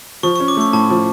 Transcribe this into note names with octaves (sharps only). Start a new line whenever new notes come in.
F3 C#6
C#4 C#6
D6
A3 C#6
A2 A5
F3